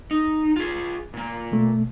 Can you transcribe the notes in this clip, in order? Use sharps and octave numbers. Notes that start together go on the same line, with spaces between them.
D#4
F4 G#4
A#2 A#3
B2 A3